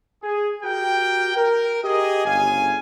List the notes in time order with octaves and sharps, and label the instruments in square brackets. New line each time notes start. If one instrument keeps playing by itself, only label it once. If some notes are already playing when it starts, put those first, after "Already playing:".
[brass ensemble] G#4
F#4 G4 A#4 G5
A#4
G4 G#4 D#5
G1 C#3 F5 G#5